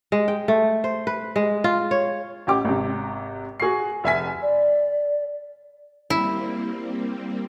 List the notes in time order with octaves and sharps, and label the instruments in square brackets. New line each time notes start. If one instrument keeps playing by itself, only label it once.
[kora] G#3
G5
A3
C5
B4
G#3
F4
C#5
[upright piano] A1 G4 D6
G#1 C3
F#4 G#4 C#6 C7
F1 E5 G#5 B6
[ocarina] D5
[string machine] G3 A#3 C4 [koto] E4